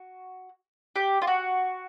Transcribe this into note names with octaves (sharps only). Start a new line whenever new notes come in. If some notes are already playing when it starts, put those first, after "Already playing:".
Already playing: F#4
G4
F4
F#4